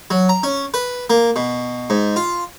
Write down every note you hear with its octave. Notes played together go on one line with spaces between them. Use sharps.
F#3
A#5
C#4
B4
A#3
B2
G#2
F4